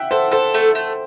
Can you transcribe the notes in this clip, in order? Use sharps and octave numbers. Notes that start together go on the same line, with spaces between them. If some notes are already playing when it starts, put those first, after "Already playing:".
Already playing: E5 F#5 G5
A4 C5
A4 C5
A3
A3